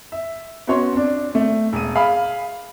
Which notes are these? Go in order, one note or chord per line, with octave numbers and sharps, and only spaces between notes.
E5
B3 C#4 F#4 C#5 C6
C4 D4
A3 C4
E1 D#7
G#4 F5 B5